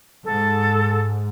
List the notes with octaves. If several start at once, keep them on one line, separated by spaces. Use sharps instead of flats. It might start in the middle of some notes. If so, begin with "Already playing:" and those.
G#2 A4